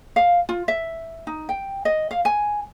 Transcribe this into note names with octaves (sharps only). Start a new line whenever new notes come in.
F5
F4
E5
D#4
G5
D#5
F5
G#5